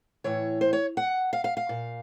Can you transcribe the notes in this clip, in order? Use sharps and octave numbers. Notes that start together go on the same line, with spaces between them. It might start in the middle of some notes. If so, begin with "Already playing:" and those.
A2 E3 C#5
C5
C#5
F#5
F5
F5
F5
A#2